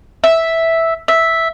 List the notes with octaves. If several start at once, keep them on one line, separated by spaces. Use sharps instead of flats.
E5
E5